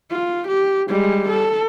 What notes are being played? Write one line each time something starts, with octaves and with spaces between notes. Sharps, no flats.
F4
G4
G3 G#3
A4